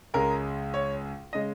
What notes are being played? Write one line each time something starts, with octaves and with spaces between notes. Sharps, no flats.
C#2 C#3 G#3 A#4
C#5
C#3 G#3 D#5